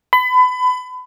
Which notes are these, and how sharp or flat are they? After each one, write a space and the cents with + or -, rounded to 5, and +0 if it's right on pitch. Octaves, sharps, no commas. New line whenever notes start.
B5 +30